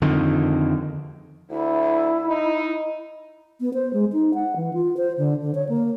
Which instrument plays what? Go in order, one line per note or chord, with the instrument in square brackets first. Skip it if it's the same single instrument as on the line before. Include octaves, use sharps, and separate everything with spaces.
[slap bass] F2 D3 D#3
[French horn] D2 [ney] E4
[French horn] D#4
[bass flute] B3
C5
G#3
D#4
F#5
E3
F4
C5
D3
D3
C#5
A#3